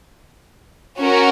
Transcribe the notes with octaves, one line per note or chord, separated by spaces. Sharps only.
C#4 F#4 A#4